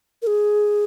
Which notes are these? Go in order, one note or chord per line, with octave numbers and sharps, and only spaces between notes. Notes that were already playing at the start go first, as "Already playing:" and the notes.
A#4
G#4